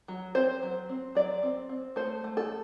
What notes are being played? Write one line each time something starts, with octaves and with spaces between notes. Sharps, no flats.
F#3
C4 C5
F#3
C4
F#3 D5
C4
C4
A3 C5
A3
A4